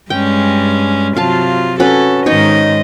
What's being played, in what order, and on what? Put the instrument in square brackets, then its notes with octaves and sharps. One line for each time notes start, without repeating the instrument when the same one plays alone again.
[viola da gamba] G2 G#3 C#4 [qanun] G5
[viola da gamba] C3 F#3 F4 [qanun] F5 A5
[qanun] C#4 F#4 B4 [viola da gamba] A4
[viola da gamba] G#2 D#3 D#5 [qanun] D#4 C#5